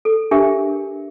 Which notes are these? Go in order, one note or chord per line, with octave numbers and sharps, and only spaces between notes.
A4
D4 G4 A#4 E5